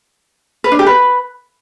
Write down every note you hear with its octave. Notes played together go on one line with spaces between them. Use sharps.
B4
D4
G4
B4